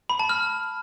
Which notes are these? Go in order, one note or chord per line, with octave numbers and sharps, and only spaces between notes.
B5
A5
F6